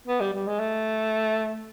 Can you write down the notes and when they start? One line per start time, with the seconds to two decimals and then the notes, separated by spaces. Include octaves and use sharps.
0.08 B3
0.21 G3
0.34 G3
0.47 G#3
0.60 A3